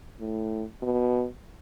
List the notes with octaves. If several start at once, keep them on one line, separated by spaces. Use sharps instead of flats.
A2
B2